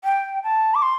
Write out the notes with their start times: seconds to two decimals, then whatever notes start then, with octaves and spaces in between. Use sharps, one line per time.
0.04 G5
0.43 A5
0.75 D6
0.82 C6